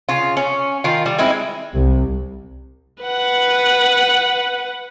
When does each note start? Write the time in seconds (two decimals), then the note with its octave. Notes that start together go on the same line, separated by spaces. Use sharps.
0.09 C#3 F4
0.37 C#4
0.84 D#3 F4
1.06 G3
1.19 G#3 C4 D#4 E4
1.73 C2
3.03 B4 F#5